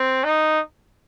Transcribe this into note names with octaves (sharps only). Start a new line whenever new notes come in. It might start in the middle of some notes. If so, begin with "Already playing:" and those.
Already playing: C4
D#4